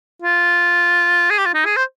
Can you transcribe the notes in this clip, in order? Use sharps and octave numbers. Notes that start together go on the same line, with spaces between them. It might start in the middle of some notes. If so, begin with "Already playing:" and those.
F4
G#4
G4
F4
D#4
G#4
C5